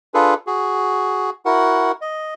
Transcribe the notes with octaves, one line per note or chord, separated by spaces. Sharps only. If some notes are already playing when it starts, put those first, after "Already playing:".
D4 F4 G#4 A4 B4
F#4 G#4
E4 F#4 A#4 F#5
D#5